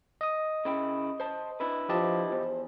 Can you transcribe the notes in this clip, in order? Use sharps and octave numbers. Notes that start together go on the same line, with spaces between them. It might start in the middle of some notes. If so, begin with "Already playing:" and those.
D#5 D#6
C#3 E4 G5
C5 A5
D4 E4 B4
F3 G4 D#5 A5
E2 C5